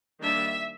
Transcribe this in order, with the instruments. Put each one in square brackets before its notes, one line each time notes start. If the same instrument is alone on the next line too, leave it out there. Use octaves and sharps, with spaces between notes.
[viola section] D#3 G3 A#3 D4 E5